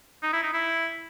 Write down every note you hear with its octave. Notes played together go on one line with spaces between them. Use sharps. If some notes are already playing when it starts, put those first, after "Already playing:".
D#4
E4
D#4
E4